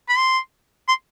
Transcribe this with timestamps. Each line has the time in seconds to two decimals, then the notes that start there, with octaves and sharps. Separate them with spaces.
0.09 B5
0.17 C6
0.88 C6